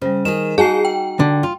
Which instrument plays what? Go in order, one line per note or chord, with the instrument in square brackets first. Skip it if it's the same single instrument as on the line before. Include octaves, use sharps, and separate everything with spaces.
[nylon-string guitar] C#3 [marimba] G3 C5
[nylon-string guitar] D#3 G#4 [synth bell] E7
[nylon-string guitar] D#4 F#4 [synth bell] G#4 G#5 C7 [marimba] A5
[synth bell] G5
[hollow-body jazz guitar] D3
[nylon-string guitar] F4